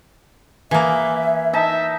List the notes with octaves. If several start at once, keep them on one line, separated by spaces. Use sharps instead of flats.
E3 A#3 G#4 E5
D#4 E5 A5